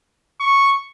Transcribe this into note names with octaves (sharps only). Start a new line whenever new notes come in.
C#6